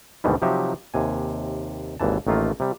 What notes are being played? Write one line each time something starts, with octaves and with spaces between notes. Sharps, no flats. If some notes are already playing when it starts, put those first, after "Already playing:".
D2 G#2 B2 D#3 E3 G3
C3 F3 F#3 D#4 G4 E5
D#2 C3 G#5
G#1 D#2 E3 A5
A1 D#3 A3 A#3 F4
C3 G3